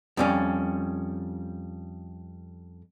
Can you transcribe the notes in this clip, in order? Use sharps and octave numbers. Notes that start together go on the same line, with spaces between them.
F2 G3 C#4